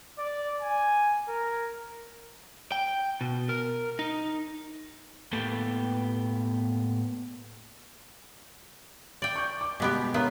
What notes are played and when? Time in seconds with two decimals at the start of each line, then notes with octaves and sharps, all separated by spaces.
0.19 D5
0.61 G#5
1.29 A#4
2.72 G5
3.21 B2
3.49 A#4
3.99 D#4
5.32 A2 A#3 B3 G4 A4 G5
9.22 D5 G5
9.36 C#6 D6 G6
9.61 D6
9.80 B2 G3 G#3 B3 G4
10.14 A#3 B3 C#4 F4 A#5